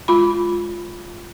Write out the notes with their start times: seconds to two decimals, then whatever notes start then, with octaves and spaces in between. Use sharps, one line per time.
0.08 G#3 F4 B5